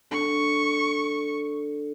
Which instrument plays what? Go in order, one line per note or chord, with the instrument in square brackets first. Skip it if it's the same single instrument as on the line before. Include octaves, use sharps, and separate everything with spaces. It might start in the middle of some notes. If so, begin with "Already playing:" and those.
[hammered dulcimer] D3 [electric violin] C#6